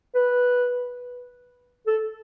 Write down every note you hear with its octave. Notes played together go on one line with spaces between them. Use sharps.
B4
A4